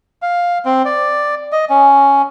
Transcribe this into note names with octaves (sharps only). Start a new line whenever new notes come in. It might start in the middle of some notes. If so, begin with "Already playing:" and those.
F5
C4
D5
D#5
C#4